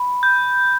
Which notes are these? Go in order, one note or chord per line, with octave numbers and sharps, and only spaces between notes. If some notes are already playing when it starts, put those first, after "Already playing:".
Already playing: B5
G6